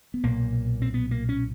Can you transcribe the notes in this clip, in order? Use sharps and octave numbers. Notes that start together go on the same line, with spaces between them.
B3
B1 A#2 A#3
C4
B3
A#3
C#4